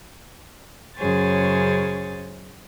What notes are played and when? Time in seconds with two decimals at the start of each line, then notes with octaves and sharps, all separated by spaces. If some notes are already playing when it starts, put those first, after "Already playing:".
0.97 F#2 C#3 G#4 C5 C#5 A6